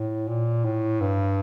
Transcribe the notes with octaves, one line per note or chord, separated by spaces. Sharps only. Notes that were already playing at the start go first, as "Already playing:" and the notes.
Already playing: A2
A#2
A2
G2